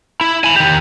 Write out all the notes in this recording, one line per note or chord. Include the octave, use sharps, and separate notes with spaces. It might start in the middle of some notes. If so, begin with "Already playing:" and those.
E4
G#5 B5
D#3 G4